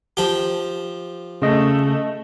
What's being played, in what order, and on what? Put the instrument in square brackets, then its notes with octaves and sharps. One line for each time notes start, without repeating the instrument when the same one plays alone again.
[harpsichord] F3 G4
[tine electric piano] C#3 D#5 [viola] A3